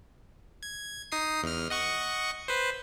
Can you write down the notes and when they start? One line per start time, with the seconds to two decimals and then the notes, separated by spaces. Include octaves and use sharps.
0.63 G#6
1.12 D#4 D#6 C7
1.43 E2 F6
1.70 D#5 F#5 C#6
2.48 B4 C5